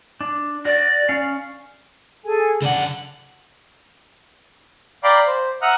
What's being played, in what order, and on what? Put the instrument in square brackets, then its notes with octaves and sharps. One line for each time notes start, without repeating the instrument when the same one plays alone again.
[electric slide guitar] D4
[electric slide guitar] F#4 [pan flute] D5
[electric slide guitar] C#4 F5
[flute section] G#4 A4 G#5
[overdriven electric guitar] C#3 F#5 [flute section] D4
[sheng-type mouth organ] D5 F5 G5 A#5 B5 D6
C5
E5 F#5 A#5 D#6 F6 F#6